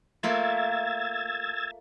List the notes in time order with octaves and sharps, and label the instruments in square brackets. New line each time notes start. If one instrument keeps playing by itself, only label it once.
[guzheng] A3 A#3 F4 [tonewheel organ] E6 G#6 A6